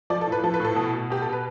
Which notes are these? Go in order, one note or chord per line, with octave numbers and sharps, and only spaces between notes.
F3 D5
A4
A2 B4
F3 A4
B4
A2 A4
B2
B2
B2 G4
B2 A4
B4